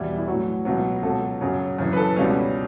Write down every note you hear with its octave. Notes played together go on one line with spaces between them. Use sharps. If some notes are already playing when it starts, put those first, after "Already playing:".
Already playing: E2 B2 G3 E4
E4
A2 F#3 F#4
C#2 B2 F#3
C#2 B2 F#3 A4
F#2 C#3 F#3
F#2 C#3 E3
B4
A4
C#2 B2 G3 C#4